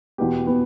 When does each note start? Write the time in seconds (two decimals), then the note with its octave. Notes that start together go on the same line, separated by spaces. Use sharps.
0.18 E2 B2 B3 G4
0.47 B2 B3